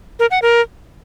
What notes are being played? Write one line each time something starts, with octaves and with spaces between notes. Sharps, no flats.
A#4
F#5
A#4